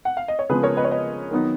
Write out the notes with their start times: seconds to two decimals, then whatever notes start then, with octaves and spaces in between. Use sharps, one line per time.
0.05 F#5
0.17 F5
0.28 D#5
0.39 C#5
0.49 C#3 F3 G#3 B3 G#4 B4
0.63 A#4 C#5
0.77 B4 D#5
0.84 C#5
0.91 B4 D#5
1.31 D#3 F#3 B3 D#4